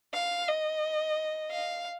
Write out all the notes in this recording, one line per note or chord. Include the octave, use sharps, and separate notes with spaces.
F5
D#5
F5